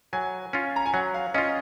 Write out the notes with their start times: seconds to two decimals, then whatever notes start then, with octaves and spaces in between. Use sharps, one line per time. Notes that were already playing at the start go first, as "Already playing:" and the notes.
0.13 F#3 G#5
0.53 C#4 F4
0.76 A#5
0.86 G#5
0.94 F#3 F#5
1.14 F5
1.34 C#4 F4 D#5